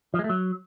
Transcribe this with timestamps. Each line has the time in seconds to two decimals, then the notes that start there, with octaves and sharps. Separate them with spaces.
0.14 F3
0.19 G#3
0.24 A3
0.29 F#3